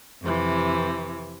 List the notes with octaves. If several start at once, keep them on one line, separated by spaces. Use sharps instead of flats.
F2 C3 E3